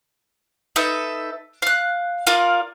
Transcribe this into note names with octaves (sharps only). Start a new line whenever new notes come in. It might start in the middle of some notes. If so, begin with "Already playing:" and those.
D#4 A4 B4 E5
F5 F#6
F4 A#4 D5 F5